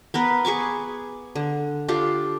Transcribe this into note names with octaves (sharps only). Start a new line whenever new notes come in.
B3 A#4 B4
G#4 B4 C#6 D6
D3
D4 F4 G4 A4